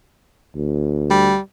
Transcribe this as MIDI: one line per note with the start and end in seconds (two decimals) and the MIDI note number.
0.56 1.34 38
1.10 1.39 55